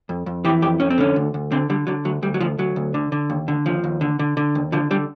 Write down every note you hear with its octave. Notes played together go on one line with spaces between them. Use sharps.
F2
F2
E3 G4
F2 G4
F2 C#4
C4
D3 C#4
D2
D2
D3 C4
D3 G3
D3 F#3
D2 F#3
D2 G3
F#3
D2 F3
D2 F#3
D2
D3
D3
D#2
D3
D#2 F3
D#2
D3
D3
D3
D#2
D3 F3
D3 G3